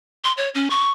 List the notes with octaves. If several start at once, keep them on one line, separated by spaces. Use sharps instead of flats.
C6
C#5
C#4
C#6